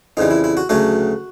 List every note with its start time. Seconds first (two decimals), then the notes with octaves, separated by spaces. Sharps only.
0.17 F2 C#3 E3 G3 D#4
0.31 E4
0.44 E4
0.57 F#4
0.69 D2 C#3 F#3 A3 F#4